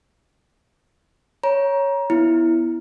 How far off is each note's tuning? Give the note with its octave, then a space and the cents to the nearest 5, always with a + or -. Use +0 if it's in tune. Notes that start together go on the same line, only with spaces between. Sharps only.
C#5 +0 A#5 +25
B3 +0 E4 +0